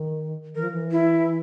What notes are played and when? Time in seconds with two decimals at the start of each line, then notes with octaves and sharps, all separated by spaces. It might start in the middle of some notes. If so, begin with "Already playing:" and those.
Already playing: D#3
0.55 E3 A#4
0.63 F3
0.71 E3
0.92 E4